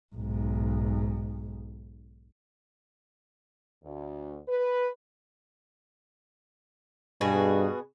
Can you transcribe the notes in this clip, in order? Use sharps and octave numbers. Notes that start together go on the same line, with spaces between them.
B1 G#2
D2
B4
G2 B2 F#4 G#4